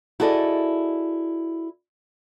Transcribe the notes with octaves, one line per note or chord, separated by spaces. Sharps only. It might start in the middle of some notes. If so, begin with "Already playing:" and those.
E4 F#4 G#4 A4 D5 D#5